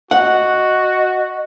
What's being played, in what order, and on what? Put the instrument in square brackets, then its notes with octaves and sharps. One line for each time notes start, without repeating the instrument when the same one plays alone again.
[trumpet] F#4 [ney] D#5 [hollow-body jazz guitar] F#5